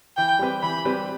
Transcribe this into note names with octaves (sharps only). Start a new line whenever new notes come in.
E3 G5
G3 C4 G4 B4
E3 B5
G3 C4 G4 B4